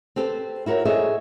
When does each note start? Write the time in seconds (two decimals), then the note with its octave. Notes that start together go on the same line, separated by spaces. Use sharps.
0.16 C4 G4 A4 B4 C5
0.66 E4 F#4 A#4 C5 C#5
0.85 G#4 A4 C5 C#5 D#5 E5